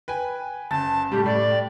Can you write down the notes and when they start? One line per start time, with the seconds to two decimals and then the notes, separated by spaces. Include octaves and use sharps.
0.08 B4 G5 G#5
0.71 F#1 A5 A6
1.12 A2 G3 G4
1.26 A2 D5
1.51 G4